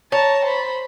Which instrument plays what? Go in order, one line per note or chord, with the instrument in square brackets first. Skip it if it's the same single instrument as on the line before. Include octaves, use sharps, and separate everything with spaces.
[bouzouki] C#5 [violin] A5 A#5
[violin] C5 B5